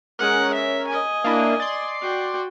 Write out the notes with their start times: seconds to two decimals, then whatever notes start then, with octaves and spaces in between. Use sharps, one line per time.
0.19 G#3 C#4 A#4 F#5
0.54 E5
0.87 D#5 G#5
1.24 A#3 D4 E4
1.60 D5 C6
2.02 F#4 G5